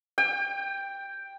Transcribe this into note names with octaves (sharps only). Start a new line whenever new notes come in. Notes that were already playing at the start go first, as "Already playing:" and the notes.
G5